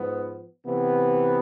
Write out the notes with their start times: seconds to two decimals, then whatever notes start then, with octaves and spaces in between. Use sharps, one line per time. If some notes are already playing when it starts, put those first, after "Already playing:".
Already playing: G#2 F3 B3
0.65 C3 E3 B3